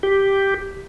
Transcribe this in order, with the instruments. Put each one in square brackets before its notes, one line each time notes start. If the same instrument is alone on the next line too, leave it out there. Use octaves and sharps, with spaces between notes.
[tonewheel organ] G4